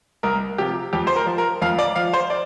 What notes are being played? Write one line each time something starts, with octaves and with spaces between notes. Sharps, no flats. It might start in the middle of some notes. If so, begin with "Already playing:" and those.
C2 A#4
C3 F3 G4
F2 G4
C5
A#4
F3
A#4
F2 F5
D5
F3 F5
C5
D5